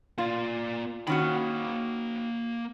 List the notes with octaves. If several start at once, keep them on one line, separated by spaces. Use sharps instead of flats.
A#3 F4 D5
D#3 A#3 C#4 F#4 B5